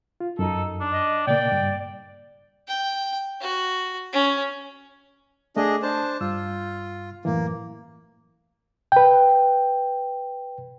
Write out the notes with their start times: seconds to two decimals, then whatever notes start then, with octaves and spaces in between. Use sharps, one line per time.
0.20 F4
0.39 F#2 D#4 A4
0.81 D4
0.92 D#5
1.27 A#2 C#3 A#3 D5 G5
1.52 G2
2.67 G5
3.41 F#4
4.13 C#4
5.56 A3 D4 G#4 D#5
5.82 D4 C5 A5
6.21 G2 F4 E6
7.25 F#2 A2 E3 A#3
8.92 B4 G5